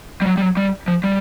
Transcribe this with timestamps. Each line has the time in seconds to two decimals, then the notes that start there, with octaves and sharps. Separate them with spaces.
0.22 G3
0.26 F#3
0.38 G3
0.42 F#3
0.57 G3
0.88 F3
1.04 G3